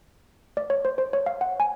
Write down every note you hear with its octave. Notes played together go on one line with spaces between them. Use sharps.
D5
C#5
C5
C5
C#5
F5
F#5
G#5